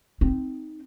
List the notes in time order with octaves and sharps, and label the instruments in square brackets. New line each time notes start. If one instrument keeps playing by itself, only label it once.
[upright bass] C4 D#4